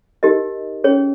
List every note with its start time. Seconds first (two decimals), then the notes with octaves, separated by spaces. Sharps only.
0.23 D#4 G4 A#4 D#5
0.84 C#4 G#4 C#5